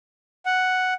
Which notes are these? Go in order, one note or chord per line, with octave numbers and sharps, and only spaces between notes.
F#5